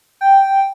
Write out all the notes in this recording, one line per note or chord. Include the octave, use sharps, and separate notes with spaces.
G5